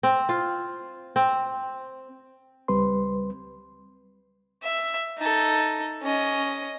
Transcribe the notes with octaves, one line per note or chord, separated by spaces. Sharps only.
C4
F4
C4
C#2 G3 C4 B4 C6
E5
D#4 A4
C#4 D#5